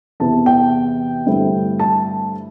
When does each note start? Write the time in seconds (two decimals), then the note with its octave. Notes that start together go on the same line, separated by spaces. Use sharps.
0.20 E2 C3 E3 B3 E4 A5
0.46 G5
1.26 G2 D3 A3 C4 E4
1.80 A5